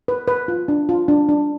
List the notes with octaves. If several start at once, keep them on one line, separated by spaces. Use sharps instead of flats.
B4
B4
F4
D4
F4
D4
D4